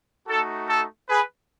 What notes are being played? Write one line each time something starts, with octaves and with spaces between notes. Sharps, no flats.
A3 D#4 F#4 A4
A4
G#4 B4